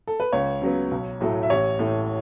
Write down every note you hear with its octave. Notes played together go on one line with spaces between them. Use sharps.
A4
B4
C#2 C#5
C#3 F#3 B3
B1
A2 F#3 A3
E5
A1 C#5
A2 A3